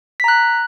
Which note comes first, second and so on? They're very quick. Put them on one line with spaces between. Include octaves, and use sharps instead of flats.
B6 A#5 F#6